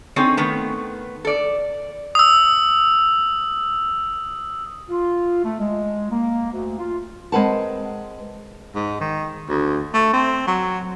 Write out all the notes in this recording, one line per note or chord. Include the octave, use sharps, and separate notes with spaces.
C4 C#4 D#4 G#4 A4 C#5
D#3 A3 B3
A4 D5
D#6 E6
F4
A3
G#3
A#3
D2
F4
G#3 C4 A#4 B4 F#5 A5
G#2
D#3
D2
A3
C4
F#3